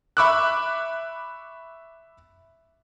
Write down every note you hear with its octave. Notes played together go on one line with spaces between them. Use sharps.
E5 B5 C#6 D6 E6 F#6